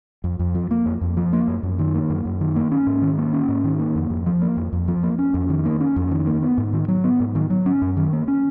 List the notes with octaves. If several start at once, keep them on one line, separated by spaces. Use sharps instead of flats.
F2
F2
F3
A#3
F2
F2
F3
A#3
F#2
F#2
D#3
A#3
F#2
F#2
D#3
A#3
C#4
G#2
D#3
A#3
C#4
G#2
D#3
A#3
F2
F2
F3
A#3
F2
F2
F3
A#3
C#4
F2
D#3
A#3
C#4
F2
D#3
A#3
B3
G#2
D#3
F#3
B3
G#2
D#3
F#3
C#4
F#2
D#3
A#3
C#4